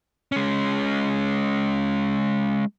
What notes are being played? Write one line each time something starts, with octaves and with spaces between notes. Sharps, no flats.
G#3 C#4